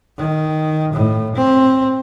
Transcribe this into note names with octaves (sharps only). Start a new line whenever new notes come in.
D#3
A2
C4